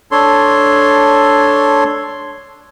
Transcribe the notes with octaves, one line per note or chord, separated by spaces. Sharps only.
D4 A4 C#5 C6